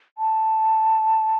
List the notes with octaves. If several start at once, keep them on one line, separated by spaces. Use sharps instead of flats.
A5